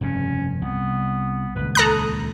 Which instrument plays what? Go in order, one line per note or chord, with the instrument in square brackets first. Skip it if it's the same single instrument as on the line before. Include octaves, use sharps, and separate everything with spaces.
[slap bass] F1 G2 C#3 [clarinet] C#4
[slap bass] C2 [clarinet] B3
[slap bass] D#1 C#2 [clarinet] B4
[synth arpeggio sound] A4 A#5 F#6 [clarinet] D#6